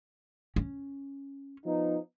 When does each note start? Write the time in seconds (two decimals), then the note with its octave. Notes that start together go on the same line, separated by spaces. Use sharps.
0.56 C#4
1.65 F3 B3 D#4